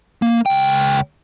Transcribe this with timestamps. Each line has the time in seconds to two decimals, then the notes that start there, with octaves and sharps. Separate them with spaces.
0.22 A#3
0.46 C#2 G5